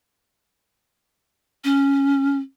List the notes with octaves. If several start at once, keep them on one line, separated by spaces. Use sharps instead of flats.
C#4